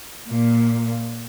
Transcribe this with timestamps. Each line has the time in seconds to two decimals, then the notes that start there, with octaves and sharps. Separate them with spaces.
0.29 A#2